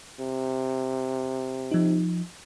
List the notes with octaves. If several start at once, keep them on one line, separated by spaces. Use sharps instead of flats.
C3
F3 D#4